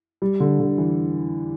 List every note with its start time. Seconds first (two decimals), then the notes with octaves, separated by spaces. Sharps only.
0.22 G3
0.40 D3
0.60 D3
0.78 E3